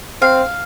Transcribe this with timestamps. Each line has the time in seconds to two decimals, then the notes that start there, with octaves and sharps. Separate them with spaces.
0.22 C4 F5